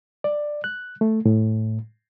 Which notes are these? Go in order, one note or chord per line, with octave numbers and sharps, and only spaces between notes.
D5
F#6
A3
A2